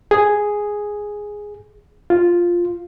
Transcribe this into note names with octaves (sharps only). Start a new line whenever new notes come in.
G#4
F4